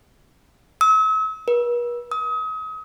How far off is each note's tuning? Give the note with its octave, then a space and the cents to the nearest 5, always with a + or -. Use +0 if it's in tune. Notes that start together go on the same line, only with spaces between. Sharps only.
E6 -45
B4 -45
D#6 +35